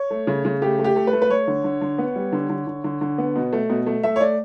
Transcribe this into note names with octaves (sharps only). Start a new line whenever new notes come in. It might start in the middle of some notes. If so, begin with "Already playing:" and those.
Already playing: C#5
A3
C#3
C#3
A3 G4
A3
G4
A3
B4
A3
B4
A3 C#5
D3
D3
D3
B3
G3
D3
D3
D3
D3
D3
B3
B2
A3
B2
A3
A3 E5
C#5
A3 D5